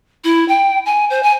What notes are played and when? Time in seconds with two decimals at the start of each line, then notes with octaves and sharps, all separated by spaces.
0.24 E4
0.48 G5
0.85 G#5
1.10 C5
1.23 G#5